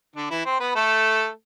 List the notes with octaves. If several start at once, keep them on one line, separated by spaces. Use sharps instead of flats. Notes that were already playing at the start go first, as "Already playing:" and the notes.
D3 D4
E3 E4
C4 C5
B3 B4
A3 A4